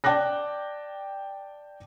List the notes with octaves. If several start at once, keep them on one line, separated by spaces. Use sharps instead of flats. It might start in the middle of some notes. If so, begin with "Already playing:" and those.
D5 G5 A5 D6 F#6 A#6